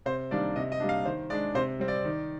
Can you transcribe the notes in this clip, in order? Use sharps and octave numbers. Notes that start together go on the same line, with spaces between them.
C3 C5
D#3 G3 A#3 D4 D5
C3 D#5
D#5
G3 A#3 D4
F5
D#3 C5
G#3 D4 D5
C3 C5
G3 C4
D5
D#3